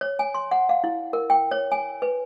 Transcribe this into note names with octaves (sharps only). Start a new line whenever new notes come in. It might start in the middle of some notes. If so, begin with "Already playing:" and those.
C#5
G#5
C6
F#5
F5
E4
A#4
G5
C#5
G#5
B4